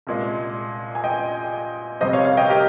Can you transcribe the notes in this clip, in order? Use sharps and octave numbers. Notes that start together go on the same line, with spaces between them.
C2 A#2 G#3
G#5
D#5 G5
F2 C3 G3 C5 D#5
C#5 F5
C#5 F5
D#5 G5
G4 A#4